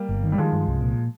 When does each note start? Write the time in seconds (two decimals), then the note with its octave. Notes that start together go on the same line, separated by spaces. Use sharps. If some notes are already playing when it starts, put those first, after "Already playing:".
Already playing: G3 A#3
0.09 G1
0.24 D#3
0.32 G3
0.38 D#3 F3 G#3
0.52 G2
0.67 C2
0.82 A#2